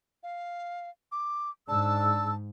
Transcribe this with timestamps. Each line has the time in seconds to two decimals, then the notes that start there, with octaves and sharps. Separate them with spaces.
0.23 F5
1.12 D6
1.68 G#2 D4 A5 E6